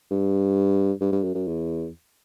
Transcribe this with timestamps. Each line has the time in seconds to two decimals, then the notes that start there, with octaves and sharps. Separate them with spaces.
0.11 G2
1.01 G2
1.12 G2
1.24 F#2
1.35 F#2
1.47 E2